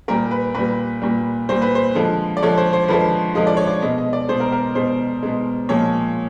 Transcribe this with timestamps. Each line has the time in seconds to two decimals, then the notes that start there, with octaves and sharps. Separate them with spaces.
0.08 A#2 G3 A#4
0.31 B4
0.55 A#2 G3 B4
1.02 A#2 G3
1.49 A#2 G3 C5
1.62 B4
1.75 C5
1.95 D3 F3 G#3
2.37 D5
2.42 D3 F3 G#3 C#5
2.57 C5
2.73 C5
2.88 D3 F3 G#3 B4
3.35 D3 F3 G#3 D#5
3.47 D5
3.57 C#5
3.68 D5
3.82 B2 G#3 D#5
3.98 D#5
4.13 D5
4.28 B2 G#3 C5
4.40 A#4
4.52 A#4
4.75 B2 G#3 C5
5.23 B2 G#3
5.69 A#2 F3 G#3 C#5